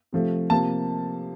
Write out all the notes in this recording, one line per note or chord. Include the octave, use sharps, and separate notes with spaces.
C3 F3 A3
C3 F3 A#3 A5